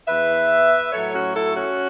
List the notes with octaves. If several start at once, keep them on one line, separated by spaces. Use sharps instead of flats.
E2 E3 B4 E5
A2 F#3 A4 C#5
C#4 F#4
E4 A4
C#4 F#4